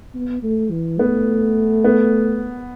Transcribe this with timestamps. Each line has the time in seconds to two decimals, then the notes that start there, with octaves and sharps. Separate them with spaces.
0.15 B3
0.43 A3
0.71 E3
0.99 A3 B3
1.84 B3